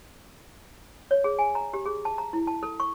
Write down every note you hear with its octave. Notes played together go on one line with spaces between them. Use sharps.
C#5
G#4
G#5
A#5
G4
G#4
A5
A#5
E4
A5
A4
C#6